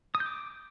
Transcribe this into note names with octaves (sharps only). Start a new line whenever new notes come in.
D#6
G6
D6